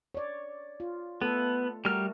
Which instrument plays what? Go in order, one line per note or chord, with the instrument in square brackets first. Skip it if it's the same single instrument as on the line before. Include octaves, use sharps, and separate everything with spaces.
[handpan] C#5 D5
F4
[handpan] A3 A4 [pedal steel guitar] B3
[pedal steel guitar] G3 F6 [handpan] A3 F#4 A#4